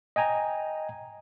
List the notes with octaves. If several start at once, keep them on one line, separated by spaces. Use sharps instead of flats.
D#5 G5 G#5 A#5